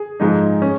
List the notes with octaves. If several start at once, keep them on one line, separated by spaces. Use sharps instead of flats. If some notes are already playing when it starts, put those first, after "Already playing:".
Already playing: G#4
G#2 F3 G#3 D#4
C#4